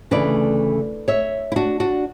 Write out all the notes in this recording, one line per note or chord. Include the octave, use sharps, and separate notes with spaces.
D2 C#3 E3 A3 D4 B4 D5
C#5 E5
E4
D4 F#4
D4 F#4